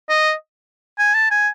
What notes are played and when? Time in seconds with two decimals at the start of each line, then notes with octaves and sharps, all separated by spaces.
0.09 D#5
0.99 G#5
1.14 A5
1.31 G#5